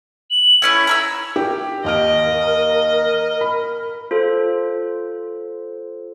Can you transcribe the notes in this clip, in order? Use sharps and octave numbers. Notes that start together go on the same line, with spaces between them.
F#7
A3 C#4 E4 G#6
A#5 C#6 E6
G4
D#2 A#4 D#5 F6 D7
B5
F4 A4 C5